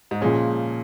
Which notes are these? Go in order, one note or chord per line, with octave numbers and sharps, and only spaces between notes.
G#2
A#2 C#3 F3 G#3 C#4